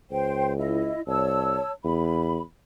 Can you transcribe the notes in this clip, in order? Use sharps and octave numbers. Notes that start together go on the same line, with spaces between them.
C#2 C5 G5
E4 D#5
C2 C#5 A5 E6
E2 B5